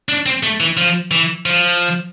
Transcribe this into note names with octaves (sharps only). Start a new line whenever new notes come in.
D4
C4
A3
E3
F3
E3
F3